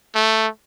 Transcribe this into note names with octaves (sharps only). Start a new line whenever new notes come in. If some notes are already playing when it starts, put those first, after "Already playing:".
A3